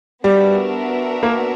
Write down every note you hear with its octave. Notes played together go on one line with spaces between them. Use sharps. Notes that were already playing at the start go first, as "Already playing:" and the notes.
G3 B3 D4 F#4 A#4 E5
A#3